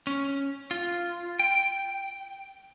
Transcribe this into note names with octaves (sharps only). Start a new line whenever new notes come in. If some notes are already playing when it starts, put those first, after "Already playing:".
C#4
F4
G5